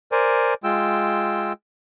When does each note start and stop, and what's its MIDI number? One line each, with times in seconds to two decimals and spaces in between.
0.12 0.54 70
0.12 0.54 72
0.12 0.54 74
0.12 0.54 80
0.64 1.53 56
0.64 1.53 65
0.64 1.53 79
0.64 1.53 88